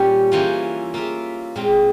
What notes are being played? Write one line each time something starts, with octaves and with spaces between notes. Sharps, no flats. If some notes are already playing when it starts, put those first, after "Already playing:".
Already playing: A#2 G3 C#4 G4 C#5
E3 A#3 C#4 F4 C5
A#3 F4 A#4 E5
A#2 G#3 C4 F4